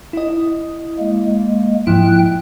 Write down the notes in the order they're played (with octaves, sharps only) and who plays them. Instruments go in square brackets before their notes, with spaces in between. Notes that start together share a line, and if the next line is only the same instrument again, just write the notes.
[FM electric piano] E4 D#5
[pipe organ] G#3 A#3
[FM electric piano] G#2 F3 E4 [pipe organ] G5 F#6